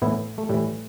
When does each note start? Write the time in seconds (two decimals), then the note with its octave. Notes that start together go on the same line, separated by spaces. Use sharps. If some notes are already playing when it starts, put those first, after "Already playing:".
0.02 A2 E3 B3 E4
0.38 A3
0.49 A2 E3 G3